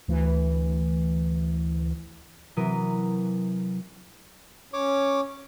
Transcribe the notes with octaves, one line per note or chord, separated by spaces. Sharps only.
D2 E3
C3 E3 F#3 A#4 B4 D#6
C#4 C#5 D6